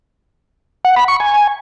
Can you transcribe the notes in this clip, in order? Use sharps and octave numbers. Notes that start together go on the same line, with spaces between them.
F#5
B5
C#6
G#5